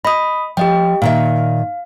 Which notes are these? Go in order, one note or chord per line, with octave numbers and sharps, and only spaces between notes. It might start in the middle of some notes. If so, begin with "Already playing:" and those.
D#5 B5 D#6
F3 G4 D#5 G5
A#2 D#3 E5 F5